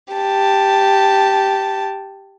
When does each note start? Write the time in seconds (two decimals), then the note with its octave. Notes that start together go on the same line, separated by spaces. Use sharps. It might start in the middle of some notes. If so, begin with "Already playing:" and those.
0.12 G4 A5